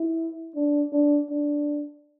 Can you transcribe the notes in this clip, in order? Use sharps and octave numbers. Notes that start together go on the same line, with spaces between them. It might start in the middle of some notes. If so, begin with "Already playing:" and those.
Already playing: E4
D4
D4
D4